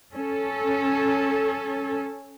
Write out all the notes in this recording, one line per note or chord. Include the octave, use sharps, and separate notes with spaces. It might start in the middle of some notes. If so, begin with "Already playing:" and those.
C#4 A4